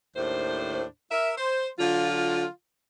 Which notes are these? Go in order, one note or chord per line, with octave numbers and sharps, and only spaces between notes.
D#2 A2 D4 C5
A#4 E5
C5
D3 F#3 F4